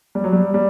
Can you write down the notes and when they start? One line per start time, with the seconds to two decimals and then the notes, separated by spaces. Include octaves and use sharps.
0.15 G3
0.24 F#3
0.33 G3
0.54 G3